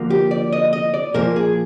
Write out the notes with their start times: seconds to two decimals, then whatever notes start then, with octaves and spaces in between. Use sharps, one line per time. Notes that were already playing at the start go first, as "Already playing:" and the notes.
Already playing: D3 F3 A#3
0.10 G4
0.31 D5
0.53 D#5
0.73 D#5
0.94 D5
1.14 A#2 F3 A#3 A#4
1.36 G#4